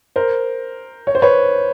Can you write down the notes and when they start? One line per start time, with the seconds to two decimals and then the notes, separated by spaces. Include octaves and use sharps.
0.16 A#4 C5
1.07 C#5
1.15 C5
1.22 B4 C#5